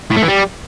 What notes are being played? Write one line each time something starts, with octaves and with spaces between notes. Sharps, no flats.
A2
A3
E3
G3